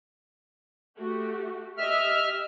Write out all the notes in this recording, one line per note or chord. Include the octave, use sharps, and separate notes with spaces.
A3 F#4 G4
G4 D#5 E5 F6